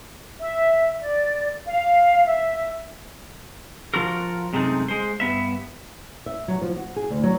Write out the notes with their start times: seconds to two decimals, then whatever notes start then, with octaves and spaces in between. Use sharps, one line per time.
0.40 E5
1.01 D5
1.66 F5
2.26 E5
3.94 F3 F4 F#4 A#4
4.53 F#2 C3 G#3 A3 C4 D#4
4.88 G#3 C5
5.20 G2 B3 E5
6.26 E5
6.48 F#3
6.62 F3
6.76 F#4
6.96 G#4
7.10 D2
7.23 F#3